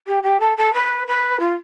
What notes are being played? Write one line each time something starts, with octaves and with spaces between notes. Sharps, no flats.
G4
G4
A4
A4
B4
B4
F4